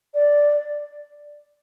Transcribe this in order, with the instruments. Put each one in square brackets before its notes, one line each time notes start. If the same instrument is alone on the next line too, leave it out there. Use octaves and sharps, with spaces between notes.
[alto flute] D5